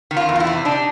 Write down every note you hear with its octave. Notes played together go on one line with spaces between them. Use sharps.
D#3
F4
E2
F4
E4
C3
D4 D#4